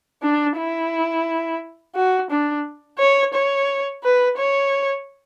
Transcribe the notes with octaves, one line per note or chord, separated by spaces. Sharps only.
D4
E4
F#4
D4
C#5
C#5
B4
C#5